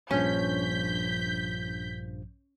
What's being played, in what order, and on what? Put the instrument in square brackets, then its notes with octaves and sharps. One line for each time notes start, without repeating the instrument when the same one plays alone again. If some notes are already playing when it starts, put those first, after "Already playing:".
[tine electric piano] A#1 G2 F3 [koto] C#4 [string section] G6 B6